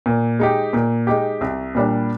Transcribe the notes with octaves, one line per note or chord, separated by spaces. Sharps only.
A#2
G#3 D#4 G4
A#2
G#3 D#4 G4
C2
A#2 G3 D4